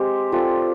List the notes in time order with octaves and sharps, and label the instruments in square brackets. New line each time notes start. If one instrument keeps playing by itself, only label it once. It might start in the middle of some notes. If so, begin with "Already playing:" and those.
Already playing: [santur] G#3 C4 [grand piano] G4
[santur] C4 F4 A4 D5